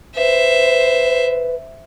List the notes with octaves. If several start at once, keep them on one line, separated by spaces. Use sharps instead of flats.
B4 C5 E5